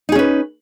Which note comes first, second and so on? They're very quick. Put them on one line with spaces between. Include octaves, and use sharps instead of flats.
D#4 G#4 C#4 B4